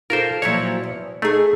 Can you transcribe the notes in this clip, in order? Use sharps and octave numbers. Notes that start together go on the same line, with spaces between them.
F4 F#4 A4 A#4 C5
A#2 F3 F#3 E4 C#5
E2
A3 D#4 G#4